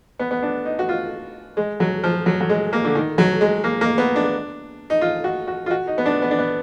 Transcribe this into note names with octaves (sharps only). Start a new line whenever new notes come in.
B3
B3
D4
D#4
F#4
F4
G#3
F#3
F3
F#3
F#3
G#3
A#3
D3
D#3
F#3
G#3
A#3
A#3
B3
D4
D#4
F4
F#4
F#4
F4
F#4
D#4
B3
D4
B3
D4
B3